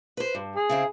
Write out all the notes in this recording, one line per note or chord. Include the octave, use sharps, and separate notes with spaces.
B4 C5
G2
G#4
C#3 C4 E4